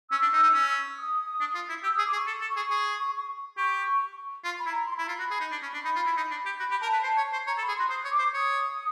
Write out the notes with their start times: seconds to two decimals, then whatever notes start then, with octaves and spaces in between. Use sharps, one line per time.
0.10 C#4 E6
0.22 D4
0.33 D#4
0.43 D#4
0.54 C#4
0.98 D#6
1.40 D4
1.55 F4
1.69 E4
1.84 G4 E6
1.96 D#6
1.99 G#4
2.05 D6
2.13 G#4
2.17 C#6
2.27 A4
2.41 A4
2.49 C#6
2.56 G#4
2.70 G#4
3.57 G4 C#6
4.44 F4 C6
4.58 B5
4.66 E4
4.72 A#5
4.87 C6
4.96 E4 B5
5.05 F4 A#5
5.15 F#4 B5
5.31 G#4
5.41 D#4
5.52 D4
5.63 C#4
5.73 D4 B5
5.85 D#4
5.96 F4
6.06 E4
6.17 D#4
6.31 D4
6.46 G4
6.60 F#4 B5
6.71 G4
6.81 A#4 A5
6.93 B4
7.03 C5
7.17 C#5
7.33 C5
7.47 C#5 A#5
7.58 A4
7.61 B5
7.68 G#4
7.75 F#4 C6
7.89 C5 D#6
8.05 C#5
8.11 D6
8.19 C5
8.34 C#5 D#6